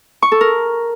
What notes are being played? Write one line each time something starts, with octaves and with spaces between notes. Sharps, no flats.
C#6
A4
A#4